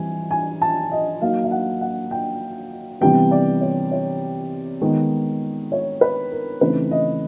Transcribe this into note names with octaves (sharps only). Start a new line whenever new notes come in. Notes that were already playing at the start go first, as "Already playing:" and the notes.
Already playing: E3 G3 C4 E4 G#5
G#5
A5
D#5
F#3 A#3 D#4 F5
F5
F#5
F#5
G5
C3 E3 G3 B3 G5
D5
C#5
C#5
D#3 G#3 B3
C#5
B4
A#4
C#3 E3 A3 C4 D#4 B4
D#5